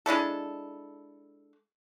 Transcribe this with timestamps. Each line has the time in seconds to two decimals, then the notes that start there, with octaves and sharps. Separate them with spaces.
0.06 G#3 D4 E4 A4